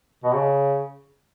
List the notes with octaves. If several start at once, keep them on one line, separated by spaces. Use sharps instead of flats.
B2
C#3